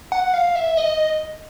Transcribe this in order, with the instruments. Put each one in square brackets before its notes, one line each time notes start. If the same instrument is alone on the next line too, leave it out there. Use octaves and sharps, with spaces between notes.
[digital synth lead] F#5
F5
E5
D#5